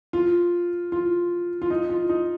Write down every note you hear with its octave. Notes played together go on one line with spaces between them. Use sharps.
F4
F4
F4
D#4
F4
D#4